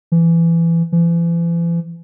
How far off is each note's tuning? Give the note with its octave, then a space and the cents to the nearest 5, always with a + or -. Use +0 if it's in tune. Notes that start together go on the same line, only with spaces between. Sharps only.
E3 +20
E3 +40